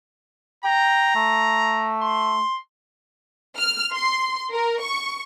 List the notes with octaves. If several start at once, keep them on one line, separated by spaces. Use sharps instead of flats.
G5 A#5
A3
C6
F6
C6
A#4
C#6